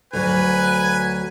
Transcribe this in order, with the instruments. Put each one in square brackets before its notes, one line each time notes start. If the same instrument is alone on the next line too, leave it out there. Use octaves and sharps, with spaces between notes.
[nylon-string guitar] D2 F#3 [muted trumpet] B4 [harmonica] G#5